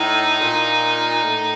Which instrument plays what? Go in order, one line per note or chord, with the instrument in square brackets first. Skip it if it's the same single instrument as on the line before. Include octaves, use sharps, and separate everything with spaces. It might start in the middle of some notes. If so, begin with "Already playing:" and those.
Already playing: [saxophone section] A2 [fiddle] D#4
[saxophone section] A#2
A2